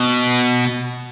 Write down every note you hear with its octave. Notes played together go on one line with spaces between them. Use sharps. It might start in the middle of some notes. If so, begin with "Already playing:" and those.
Already playing: B2